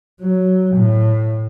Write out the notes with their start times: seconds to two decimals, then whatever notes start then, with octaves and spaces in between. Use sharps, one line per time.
0.22 F#3
0.76 A2